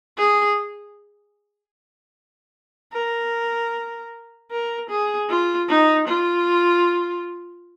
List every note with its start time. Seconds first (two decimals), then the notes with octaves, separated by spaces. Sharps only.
0.18 G#4
2.93 A#4
4.51 A#4
4.90 G#4
5.29 F4
5.69 D#4
6.08 F4